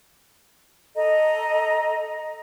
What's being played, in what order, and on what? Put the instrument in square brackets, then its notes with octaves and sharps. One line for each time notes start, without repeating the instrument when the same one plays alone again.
[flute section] A4 D#5 A#5